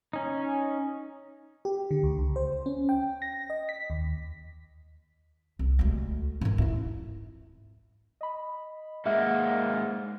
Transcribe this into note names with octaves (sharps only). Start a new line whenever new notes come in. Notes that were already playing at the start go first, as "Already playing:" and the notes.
C#4 D#4
G4
D3
D2
C#2
C5
C#4
G5
A#6
D#5
B6
D#2
C2
D2 G#3
G#2 D#3
G2 E4
D#5 B5
G#2 A#3 G#4 E5 F#5